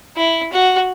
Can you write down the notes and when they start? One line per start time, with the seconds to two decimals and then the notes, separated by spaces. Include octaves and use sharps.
0.17 E4
0.53 F#4